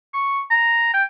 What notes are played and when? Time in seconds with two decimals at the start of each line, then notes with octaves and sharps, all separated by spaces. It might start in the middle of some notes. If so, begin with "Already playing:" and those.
0.14 C#6
0.50 A#5
0.93 G5